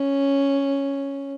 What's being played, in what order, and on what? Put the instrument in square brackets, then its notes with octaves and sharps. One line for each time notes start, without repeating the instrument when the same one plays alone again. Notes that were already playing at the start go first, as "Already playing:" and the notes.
Already playing: [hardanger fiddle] C#4